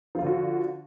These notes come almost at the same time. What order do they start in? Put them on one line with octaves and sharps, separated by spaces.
F3 F4 D3 F#4